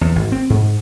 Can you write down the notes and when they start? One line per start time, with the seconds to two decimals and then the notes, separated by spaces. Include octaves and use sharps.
0.01 E2
0.15 G#1
0.32 C4
0.50 G#2